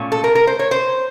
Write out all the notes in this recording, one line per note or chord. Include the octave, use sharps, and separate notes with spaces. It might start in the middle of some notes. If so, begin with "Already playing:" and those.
Already playing: A#2 A3 C#4
A4
A#4
A#4
C5
C#5
C5